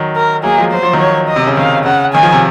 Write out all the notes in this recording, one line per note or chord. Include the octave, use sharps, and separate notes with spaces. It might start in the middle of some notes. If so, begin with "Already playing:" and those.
Already playing: D#3 F#3
A#4
F#3 A#3 G#4
F3 G#3
F#3 C5
F3
D#3 F#3
C#5
D#5
C3
C#3
C3 D#3 F5
C#3 F#5
D#3 G#5
F3
C3 D#3